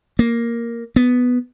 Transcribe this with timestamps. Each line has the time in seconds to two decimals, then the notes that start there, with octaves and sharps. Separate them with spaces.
0.19 A#3
0.96 B3